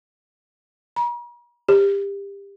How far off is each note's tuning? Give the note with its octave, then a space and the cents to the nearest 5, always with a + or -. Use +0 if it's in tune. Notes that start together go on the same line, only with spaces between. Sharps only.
A#5 +45
G4 +25